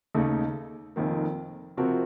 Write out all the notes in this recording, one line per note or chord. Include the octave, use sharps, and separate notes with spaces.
D#2 C#3 A3 D#4
F1 F2 D#3 A#3
C3 F3 C4 F#4 A#4